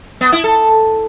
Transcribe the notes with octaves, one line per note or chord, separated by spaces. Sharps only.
B3
E4
A4